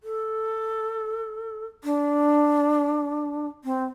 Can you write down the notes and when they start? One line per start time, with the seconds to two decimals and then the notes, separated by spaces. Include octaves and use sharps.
0.03 A4
1.84 D4
3.64 C4